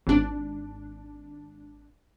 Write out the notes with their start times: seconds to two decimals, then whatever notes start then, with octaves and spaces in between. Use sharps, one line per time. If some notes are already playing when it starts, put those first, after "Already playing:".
0.07 G#1 D4